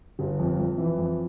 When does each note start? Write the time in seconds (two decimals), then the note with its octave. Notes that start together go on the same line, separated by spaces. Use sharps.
0.19 G1
0.39 F2
0.59 F2
0.78 E3
0.98 F2